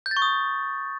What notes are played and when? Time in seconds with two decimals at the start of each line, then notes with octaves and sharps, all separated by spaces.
0.06 G6
0.11 A6
0.17 C#6
0.22 D#6